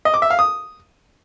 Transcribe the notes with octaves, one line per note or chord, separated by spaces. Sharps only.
D#5
D6
E5
F5
D#6